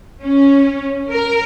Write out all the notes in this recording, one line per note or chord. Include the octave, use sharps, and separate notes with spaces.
C#4
A#4